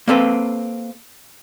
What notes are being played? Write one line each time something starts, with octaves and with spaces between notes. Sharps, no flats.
A#3 C4 A4 B4